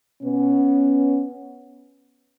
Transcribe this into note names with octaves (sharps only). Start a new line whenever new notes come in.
B2 B3 C#4